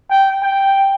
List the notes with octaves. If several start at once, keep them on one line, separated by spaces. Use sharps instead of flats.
G5
G5